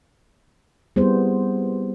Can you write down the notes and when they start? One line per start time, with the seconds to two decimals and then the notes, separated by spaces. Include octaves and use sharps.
0.96 G3 B3 C4 E4 G#4 C5